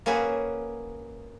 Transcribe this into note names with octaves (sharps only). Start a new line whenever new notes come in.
A#3 C#4 F#4 G#4 B4